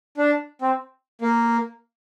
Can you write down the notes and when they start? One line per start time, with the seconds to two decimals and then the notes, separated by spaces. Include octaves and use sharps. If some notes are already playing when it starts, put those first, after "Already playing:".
0.17 D4
0.62 C4
1.22 A#3